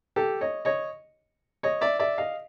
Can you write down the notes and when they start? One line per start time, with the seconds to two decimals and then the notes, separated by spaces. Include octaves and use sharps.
0.16 G4 A4
0.41 C#5 D#5
0.65 C#5 D#5
1.63 C#5 D#5
1.81 D5 E5
1.99 D5 E5
2.18 D#5 F5